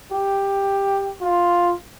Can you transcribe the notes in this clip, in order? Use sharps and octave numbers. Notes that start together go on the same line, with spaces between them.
G4
F4